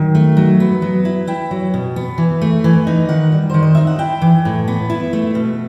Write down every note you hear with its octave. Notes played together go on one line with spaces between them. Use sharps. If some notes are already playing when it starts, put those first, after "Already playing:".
Already playing: D#3 F#3
A3
F#3
B3
F#3
E4
E4 G5
F#3
B2
B3
E3
A3
E3
D#4
D#3 F#5
G3
D#3 C5
D#5
D#4 E5
F#5
E4 G5
E3
A2
B3
E4
A3
B2